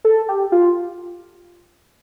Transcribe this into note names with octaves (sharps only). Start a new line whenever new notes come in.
A4
G4
F4